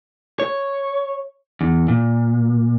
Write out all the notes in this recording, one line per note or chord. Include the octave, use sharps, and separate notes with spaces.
C#5
E2
A#2